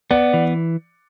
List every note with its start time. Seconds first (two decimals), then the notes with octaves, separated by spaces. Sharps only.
0.10 B3 D5 F#5
0.34 E3